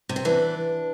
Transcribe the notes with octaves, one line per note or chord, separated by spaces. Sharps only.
C3
C4
E3 D4